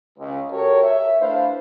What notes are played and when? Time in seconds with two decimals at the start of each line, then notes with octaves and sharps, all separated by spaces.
0.19 C#2
0.50 F#4 G4 A4 A#4 C#5
0.83 E5
1.20 A3 D4 E4 B4 C5 F5